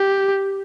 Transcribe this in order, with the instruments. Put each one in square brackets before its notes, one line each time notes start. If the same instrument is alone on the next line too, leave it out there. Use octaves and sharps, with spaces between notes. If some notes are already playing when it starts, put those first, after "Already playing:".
Already playing: [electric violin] G4